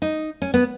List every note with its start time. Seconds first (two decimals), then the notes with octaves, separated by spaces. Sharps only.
0.02 D#4
0.42 C#4
0.54 B3